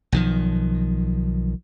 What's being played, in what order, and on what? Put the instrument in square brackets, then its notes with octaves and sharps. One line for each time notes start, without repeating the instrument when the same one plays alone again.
[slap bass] B1 D#3 F3